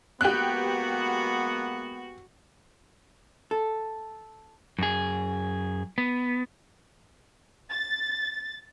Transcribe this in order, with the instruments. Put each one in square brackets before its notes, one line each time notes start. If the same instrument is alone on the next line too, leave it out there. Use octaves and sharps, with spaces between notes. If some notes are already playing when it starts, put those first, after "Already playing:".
[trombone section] G#3 A#3 B3 [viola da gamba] F#4 [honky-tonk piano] G4 F#6
[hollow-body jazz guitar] A4
[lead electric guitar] F#2 G#4
B3
[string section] A6